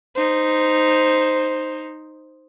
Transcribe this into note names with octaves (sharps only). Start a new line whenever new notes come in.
D#4 C5